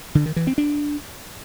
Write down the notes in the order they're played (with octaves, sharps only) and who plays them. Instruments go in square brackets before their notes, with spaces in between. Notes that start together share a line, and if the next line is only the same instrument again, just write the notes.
[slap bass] D3
D#3
E3
C4
D4